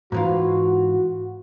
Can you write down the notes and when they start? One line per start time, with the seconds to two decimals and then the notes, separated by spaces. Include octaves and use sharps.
0.12 G#2 E3 F4 F#4